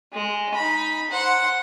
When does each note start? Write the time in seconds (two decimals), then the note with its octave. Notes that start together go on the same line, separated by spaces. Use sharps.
0.13 G#3
0.54 D#4 B5
1.11 C5 F#5